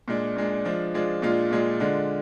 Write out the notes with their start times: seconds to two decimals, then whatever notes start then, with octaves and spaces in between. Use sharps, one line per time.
0.08 A#2 G#3 D4
0.36 A#2 G#3 D4
0.65 F3 G#3 D4 F4
0.94 F3 G#3 D4 F4
1.22 A#2 G#3 D4 F4
1.51 A#2 G#3 D4 F4
1.80 D3 G#3 D4 F4